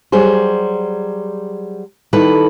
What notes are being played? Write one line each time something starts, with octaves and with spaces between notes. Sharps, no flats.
F#3 G3 G#4 C5
D#3 G3 E4 A4 B4